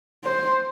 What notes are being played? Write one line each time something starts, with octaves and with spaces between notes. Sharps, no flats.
C5